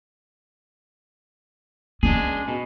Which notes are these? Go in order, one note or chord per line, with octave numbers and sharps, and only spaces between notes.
G#3 C#4 D4 G#4
B2